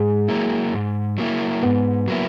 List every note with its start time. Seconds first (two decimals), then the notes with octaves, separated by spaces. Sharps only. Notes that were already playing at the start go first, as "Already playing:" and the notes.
Already playing: G#2 G#3
0.28 F#3 A#3 E4
0.73 G#2
1.18 F#3 A#3 E4
1.63 G#2 B3
2.08 F#3 A#3 E4